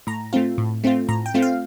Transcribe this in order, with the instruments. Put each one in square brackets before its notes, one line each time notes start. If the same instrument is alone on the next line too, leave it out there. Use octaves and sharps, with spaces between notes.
[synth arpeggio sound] A2 A#5
A3 C4 F4
A2
A3 C4 F4
A2 A#5
G5
A3 C4 F4
F5